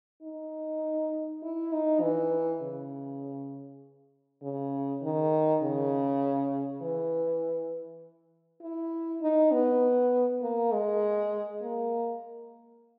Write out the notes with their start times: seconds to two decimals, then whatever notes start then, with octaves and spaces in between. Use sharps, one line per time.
0.23 D#4
1.43 E4
1.72 D#4
2.02 E3
2.62 C#3
4.43 C#3
5.02 D#3
5.62 C#3
6.82 E3
8.62 E4
9.22 D#4
9.52 B3
10.42 A#3
10.72 G#3
11.62 A#3